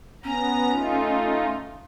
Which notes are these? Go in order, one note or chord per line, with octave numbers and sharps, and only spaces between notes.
B3 C#4 A#5
A3 D#4 F4